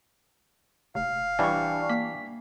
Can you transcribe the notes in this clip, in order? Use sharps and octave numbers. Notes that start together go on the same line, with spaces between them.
F1 F5
E3 G3 D4 D5 C#6
A#3 B6